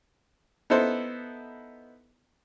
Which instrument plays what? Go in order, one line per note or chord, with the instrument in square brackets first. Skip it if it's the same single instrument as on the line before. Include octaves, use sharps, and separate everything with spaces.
[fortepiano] B3 D#4 E4 A4 C5